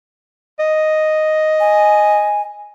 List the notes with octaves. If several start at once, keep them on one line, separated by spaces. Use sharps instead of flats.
D#5
G#5